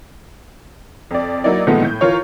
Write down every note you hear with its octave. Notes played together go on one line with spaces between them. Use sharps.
F2 D5
F#3 A#3 D#4 E4 D5
A#2 D#3 F3 G#3 A3 B3
A2 G6
E3 F4 A#4 C#5